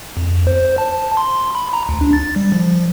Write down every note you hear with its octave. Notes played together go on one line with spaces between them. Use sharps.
F2
C5
A5
C6
B5
A#5
D2
D4
A6
G3
F3